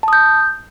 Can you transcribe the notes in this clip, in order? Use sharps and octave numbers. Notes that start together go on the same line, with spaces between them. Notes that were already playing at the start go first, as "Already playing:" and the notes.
A5 D#6 G6